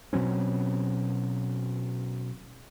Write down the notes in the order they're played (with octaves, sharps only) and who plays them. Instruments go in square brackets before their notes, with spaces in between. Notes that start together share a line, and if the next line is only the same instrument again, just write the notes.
[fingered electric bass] B2 F#3 C4 C#4